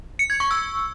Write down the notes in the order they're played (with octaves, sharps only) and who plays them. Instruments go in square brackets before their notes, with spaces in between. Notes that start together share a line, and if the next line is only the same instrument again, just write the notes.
[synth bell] C#7
G#6
C#6
E6